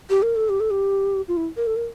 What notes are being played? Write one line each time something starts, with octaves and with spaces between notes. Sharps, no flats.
G4
A#4
A4
G4
A4
G4
F4
E4
A#4
A4
A#4